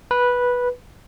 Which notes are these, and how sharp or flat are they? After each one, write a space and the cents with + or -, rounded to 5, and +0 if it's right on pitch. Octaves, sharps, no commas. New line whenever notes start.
B4 -10